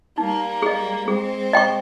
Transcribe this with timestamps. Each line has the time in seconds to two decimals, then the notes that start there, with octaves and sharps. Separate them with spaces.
0.17 G3 A#3 D#4
0.62 G#4 D#5
1.08 G#3 C4 G#4
1.53 D#5 G5 C#6